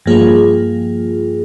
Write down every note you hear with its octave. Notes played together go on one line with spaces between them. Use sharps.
G2 F3 A#3 F4 G#4